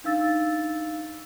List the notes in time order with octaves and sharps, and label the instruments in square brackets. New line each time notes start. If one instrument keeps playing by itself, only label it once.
[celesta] D4 D#4 F5 E6 A6